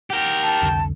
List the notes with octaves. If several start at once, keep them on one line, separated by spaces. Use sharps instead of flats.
G4 A#4 F#5 G5
A5
C2 F2 D3